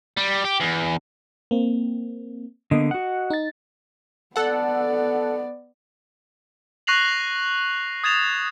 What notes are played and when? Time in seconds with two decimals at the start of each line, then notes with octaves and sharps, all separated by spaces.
0.17 G3
0.45 G4
0.61 E2
1.51 A#3 C4
2.71 D3 A#3 B3 D#5
2.91 F#4 F#5
3.30 D#4 A6
4.36 B3 A4 D5 F#5
6.87 C#6 F#6 A#6 C7 F7 F#7
8.04 D#6 G#6 A6 E7 F7